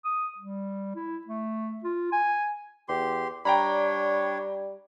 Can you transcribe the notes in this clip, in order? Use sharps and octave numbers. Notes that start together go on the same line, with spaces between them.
D#6
G3
E4
A3
F4
G#5
E2 G4 C6
G3 D4 C#5 G5 A#5 B5